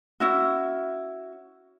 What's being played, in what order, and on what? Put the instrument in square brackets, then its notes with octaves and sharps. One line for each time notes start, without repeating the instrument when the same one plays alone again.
[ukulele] C#4 E4 F#4